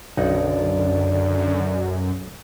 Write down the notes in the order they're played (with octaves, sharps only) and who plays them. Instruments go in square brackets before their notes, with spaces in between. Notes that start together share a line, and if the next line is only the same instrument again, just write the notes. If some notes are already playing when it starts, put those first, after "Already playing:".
[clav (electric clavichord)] B1 D#4 F#5 [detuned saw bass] F#2 [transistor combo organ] D3 [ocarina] D5